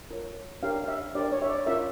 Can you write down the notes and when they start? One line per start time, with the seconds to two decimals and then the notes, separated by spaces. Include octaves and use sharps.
0.11 F4 A#4 C#5
0.63 D4 G4 A#4 C#5 F5
0.84 F5
0.88 E5
1.15 D4 G4 A#4 C#5 D5
1.32 C#5
1.42 E5
1.50 D5
1.66 C#4 F4 A#4 C#5 E5